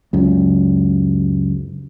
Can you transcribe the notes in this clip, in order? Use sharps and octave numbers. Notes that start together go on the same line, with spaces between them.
C#2 F#2